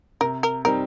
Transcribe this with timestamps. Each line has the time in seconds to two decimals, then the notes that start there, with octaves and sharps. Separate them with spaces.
0.21 C3 A#4
0.43 A#4
0.65 G3 C4 D#4 A#4